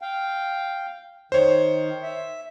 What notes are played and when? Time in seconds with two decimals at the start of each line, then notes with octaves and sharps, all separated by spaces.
0.02 F5 G5
1.32 D#3 C5 C#5
2.02 E5